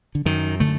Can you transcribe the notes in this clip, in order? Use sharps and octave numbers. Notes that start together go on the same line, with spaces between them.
D3
F#2 D#3
D3 A3